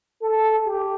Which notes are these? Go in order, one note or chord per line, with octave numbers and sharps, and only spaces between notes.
A4
G4